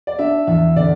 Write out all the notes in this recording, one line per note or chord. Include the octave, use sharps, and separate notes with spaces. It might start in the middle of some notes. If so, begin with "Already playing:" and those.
D5
D4 E5
E2 E5
D3 D5